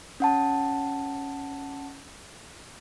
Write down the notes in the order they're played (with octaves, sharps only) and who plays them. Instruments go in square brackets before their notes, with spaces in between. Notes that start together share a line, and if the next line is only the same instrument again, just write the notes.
[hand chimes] C#4 F#5 A5